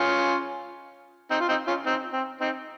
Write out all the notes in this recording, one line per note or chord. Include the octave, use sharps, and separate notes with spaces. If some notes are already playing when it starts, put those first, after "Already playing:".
Already playing: C#4 F4
C4 D#4
F4
C4 D#4
C#4 F4
C4 D#4
C4
C4 D#4